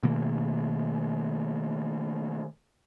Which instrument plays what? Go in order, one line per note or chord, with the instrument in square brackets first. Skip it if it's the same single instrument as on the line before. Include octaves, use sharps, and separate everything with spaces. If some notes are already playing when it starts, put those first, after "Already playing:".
[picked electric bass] B2 D#3 A3 A#3